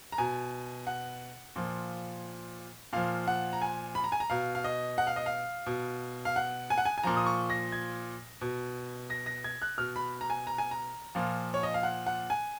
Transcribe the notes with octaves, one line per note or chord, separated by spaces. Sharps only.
A#5
B2 G#5
F#5
A#2 F3
A#2 F3 F5
F#5
A#5
G#5
B5
A#5
G#5
A#5
B2 F5
F5
D#5
F#5
F5
D#5
F5
B2
F5
F#5
G#5
F#5
G#5
G#5
A#2 F3 A#5
D#6
C#6
A#6
G#6
B2
A#6
A#6
G#6
F#6
B2 F6
B5
A#5
G#5
A#5
G#5
A#5
A#2 F3
C#5
D#5
F5
F#5
F#5
G#5